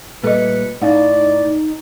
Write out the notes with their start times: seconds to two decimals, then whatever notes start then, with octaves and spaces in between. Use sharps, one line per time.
0.23 A#2 G3 A3 A4 B4 D#5 C#7
0.82 A2 C#4 D#4 D5 F5 F#5